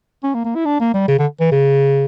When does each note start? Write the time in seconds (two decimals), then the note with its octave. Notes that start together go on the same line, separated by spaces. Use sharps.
0.23 C#4
0.34 A#3
0.45 A#3
0.55 E4
0.65 D4
0.80 A#3
0.94 G3
1.08 C#3
1.19 D3
1.40 E3
1.52 C#3